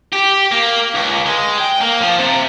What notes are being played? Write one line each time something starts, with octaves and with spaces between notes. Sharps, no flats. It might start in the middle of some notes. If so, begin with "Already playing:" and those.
G4
A#3
C#2
G#3
G5
A#3
F3
C3